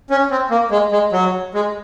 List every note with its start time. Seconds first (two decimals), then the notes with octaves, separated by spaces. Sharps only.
0.10 C#4
0.31 C4
0.51 A#3
0.71 G#3
0.92 G#3
1.12 F#3
1.54 G#3